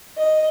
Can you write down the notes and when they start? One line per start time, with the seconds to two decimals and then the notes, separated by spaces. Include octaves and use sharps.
0.17 D#5